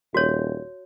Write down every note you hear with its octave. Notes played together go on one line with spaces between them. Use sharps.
D#1 F#4 C#5